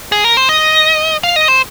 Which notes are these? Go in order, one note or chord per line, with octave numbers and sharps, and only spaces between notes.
G#4
A#4
C5
D#5
F5
D#5
C5